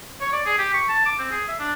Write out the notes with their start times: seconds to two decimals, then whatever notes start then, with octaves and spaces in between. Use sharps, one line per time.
0.21 C#5
0.33 D5
0.46 G#4
0.58 G4
0.74 C#6
0.89 A5
1.06 D6
1.19 C4
1.31 G#4
1.48 E5
1.60 D4